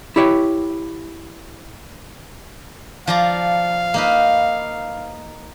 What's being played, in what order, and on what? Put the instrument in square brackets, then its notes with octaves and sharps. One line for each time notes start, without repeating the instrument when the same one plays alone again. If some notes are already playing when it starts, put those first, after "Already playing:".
[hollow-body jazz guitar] E4 G4 C#5 G5
[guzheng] F3 D5 A#5 [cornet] F5
[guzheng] A#3 D#4 B4